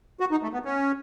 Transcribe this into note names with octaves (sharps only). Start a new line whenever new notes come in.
F#4
D#4
A3
B3
C#4